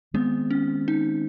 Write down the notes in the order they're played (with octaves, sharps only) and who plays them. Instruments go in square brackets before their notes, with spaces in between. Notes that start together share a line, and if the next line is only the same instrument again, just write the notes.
[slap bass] D#3 G#3 C4 [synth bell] B3
[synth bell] C#4
D#4